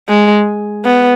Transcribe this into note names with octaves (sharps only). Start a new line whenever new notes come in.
G#3
B3